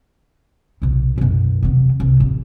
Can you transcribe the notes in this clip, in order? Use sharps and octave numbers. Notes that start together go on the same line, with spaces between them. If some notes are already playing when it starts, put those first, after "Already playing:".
B1 C3
B1 F#2
E2 C3
C2
A1